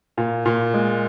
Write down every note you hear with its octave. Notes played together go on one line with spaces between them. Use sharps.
A#2
A#2
G#3